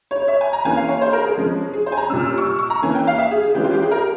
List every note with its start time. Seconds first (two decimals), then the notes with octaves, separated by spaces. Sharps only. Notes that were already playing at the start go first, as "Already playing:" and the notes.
0.11 C#5
0.22 C#5
0.28 E5
0.41 G#5
0.53 A#5
0.65 E3 A#3 C#4 G#5
0.77 F5
0.89 C#5
1.01 C5
1.13 A#4
1.25 G#4
1.38 F3 G#3 C#4
1.73 G#4
1.86 C5
1.92 G#5
1.97 A#5
2.10 A#2 G3 C#4 E6
2.20 F6
2.27 E6
2.38 C#6
2.47 E6
2.59 C#6
2.70 A#5
2.82 E3 A#3 C#4 G#5
2.95 G5
3.07 F5
3.18 E5
3.31 G#4
3.43 G#4
3.55 E3 G#3 C#4 G4
3.64 F4
3.73 G4
3.83 G#4
3.91 A#4